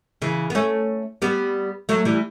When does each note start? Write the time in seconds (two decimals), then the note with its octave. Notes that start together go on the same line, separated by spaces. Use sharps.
0.22 C#3 E3
0.50 B3
0.55 A3 C#4
1.22 G3 B3
1.89 F#3 A3
2.05 E3 G3